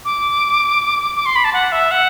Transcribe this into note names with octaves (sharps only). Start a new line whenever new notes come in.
D6
D6
C6
B5
A5
F#5
E5
F#5